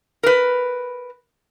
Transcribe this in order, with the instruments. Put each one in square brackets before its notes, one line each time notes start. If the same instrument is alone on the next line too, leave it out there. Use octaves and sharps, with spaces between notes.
[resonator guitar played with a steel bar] A#4 B4